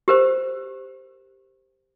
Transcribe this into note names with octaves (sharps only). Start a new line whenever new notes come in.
G4 A#4 C5